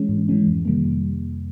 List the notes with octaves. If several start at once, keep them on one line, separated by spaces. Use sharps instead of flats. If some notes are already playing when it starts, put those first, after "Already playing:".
Already playing: E3 G#3 C#4
G#2
E3 G#3 C#4
F2
C3 D#3 G3 A#3
F2